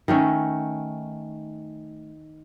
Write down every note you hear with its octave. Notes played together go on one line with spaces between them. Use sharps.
D#3 A3 C#4